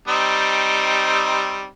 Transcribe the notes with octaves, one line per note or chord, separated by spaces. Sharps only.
G3 C4 D#4